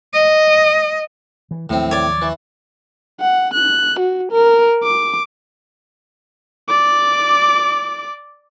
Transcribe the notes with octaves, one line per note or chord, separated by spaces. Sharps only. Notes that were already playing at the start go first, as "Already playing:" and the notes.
D#5
E3
D#2 A2 F3 F#3 C4
C#5 D5
E3
F#5
F#6
F#4
A#4
D6
D5 D6